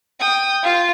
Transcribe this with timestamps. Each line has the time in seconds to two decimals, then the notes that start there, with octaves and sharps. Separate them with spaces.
0.20 G5 D#6
0.63 F4 F5